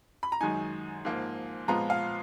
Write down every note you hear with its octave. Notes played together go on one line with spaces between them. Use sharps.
B5
A#5
F#2 D#3 G#3 D#4 G#5
G#2 F3 A#3 F4
A#2 F3 G#3 B3 F4 A#5
F5